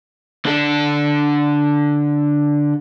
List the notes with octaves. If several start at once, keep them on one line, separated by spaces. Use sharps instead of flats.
D3 A4